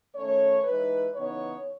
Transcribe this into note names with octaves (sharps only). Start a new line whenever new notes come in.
D#3 A3 C#4 C#5
E3 G#3 D#4 B4
C#3 E3 B3 D#4 C#5